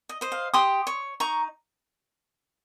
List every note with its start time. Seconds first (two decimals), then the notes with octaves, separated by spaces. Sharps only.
0.09 D#5
0.21 C5 D#5
0.32 F5
0.54 G4 C6 D#6
0.87 C#5
1.20 D#4 A#5 C#6